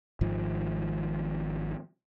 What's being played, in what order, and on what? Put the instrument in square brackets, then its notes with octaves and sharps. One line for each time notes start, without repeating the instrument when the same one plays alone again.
[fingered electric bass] G#1 G#2 D#3 F3